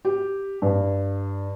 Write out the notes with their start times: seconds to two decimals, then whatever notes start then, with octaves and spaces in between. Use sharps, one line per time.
0.05 G4
0.62 G2